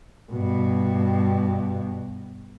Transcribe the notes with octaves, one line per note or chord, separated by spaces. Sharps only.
G2 B2